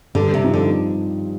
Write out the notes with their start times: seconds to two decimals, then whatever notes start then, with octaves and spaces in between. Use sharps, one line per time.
0.15 G2 D3
0.34 C3
0.44 F3 C4 D#4
0.54 D3